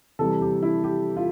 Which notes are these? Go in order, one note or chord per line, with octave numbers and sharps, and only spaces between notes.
C3 E3 G3 A4
G4
E4
G4
F4